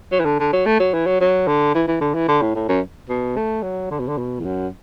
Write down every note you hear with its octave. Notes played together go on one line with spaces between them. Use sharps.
F#3
E3
D3
D3
F#3
A3
F#3
E3
F#3
F#3
D3
E3
E3
D3
E3
D3
A2
A2
F#2
B2
A3
F#3
D3
B2
D3
B2
E2
F#2